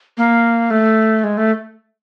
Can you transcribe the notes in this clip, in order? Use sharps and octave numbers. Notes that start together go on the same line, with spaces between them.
A#3
A3
G#3
A3